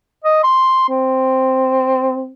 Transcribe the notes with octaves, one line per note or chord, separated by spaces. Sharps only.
D#5
C6
C4